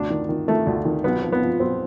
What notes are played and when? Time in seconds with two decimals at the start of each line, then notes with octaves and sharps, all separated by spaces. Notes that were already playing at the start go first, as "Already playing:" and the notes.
Already playing: D2 D4
0.10 D#3
0.29 D#3
0.48 D#3 A3
0.67 D2
0.85 D#3
1.04 B1 B3
1.22 F3
1.32 B3
1.42 F3
1.60 B1 C4